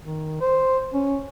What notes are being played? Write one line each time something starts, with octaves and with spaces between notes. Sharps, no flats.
D#3
C5
C#4